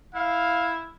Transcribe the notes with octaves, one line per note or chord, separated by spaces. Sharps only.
E4 F5